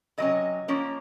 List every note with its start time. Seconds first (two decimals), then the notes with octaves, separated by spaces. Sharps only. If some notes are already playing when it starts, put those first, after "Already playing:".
0.18 C3 F#3 C#4 D#5
0.68 F3 A#3 C#4